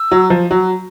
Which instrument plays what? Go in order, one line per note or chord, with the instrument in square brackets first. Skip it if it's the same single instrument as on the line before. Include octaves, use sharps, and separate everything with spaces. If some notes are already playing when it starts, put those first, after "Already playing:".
Already playing: [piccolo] E6
[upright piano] F#3
F3
F#3